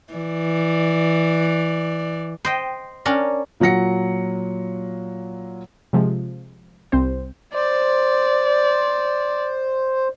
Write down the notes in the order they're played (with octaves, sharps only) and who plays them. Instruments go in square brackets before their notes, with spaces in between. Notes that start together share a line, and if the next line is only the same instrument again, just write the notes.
[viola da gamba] E3 D5
[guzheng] C5 D#5 G5
C#4 D4 A#4
[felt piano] A#2 F#3 F#5 A#6 C#7
[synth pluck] C3 F3 G#3
C2 C4 C5
[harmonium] C5 [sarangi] D5